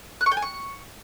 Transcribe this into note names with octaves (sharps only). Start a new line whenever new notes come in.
F#6
C#6
G5
G#5
C#6